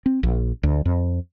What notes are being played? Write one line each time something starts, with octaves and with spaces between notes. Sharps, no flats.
C4
A#1
D2
F2